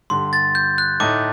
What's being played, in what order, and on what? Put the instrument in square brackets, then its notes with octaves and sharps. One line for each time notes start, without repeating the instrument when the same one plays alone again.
[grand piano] G2 D3 G3 [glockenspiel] C6
[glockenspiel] A6
G6
F#6
[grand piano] A2 A3 D#4 [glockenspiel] D6